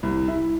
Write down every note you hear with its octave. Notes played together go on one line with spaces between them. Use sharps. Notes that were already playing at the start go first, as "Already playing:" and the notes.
C2
E4